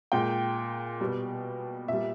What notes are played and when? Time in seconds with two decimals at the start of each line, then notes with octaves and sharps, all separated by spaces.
0.12 A#2 G#3 G5
1.01 B2 G3
1.88 A#2 G3 E5